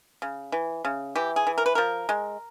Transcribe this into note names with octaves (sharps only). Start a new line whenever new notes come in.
C#3
E3
C#3
E3 G4
G#4
E3
A#4
B4
F3 A#4
G#3